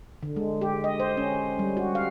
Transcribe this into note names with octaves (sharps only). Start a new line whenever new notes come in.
D3
G#3
G4
D#5
C5
C#4
G3
F#4
F5